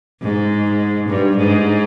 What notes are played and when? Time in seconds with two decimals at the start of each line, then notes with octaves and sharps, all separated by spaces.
0.22 G#2
1.09 G2
1.37 G#2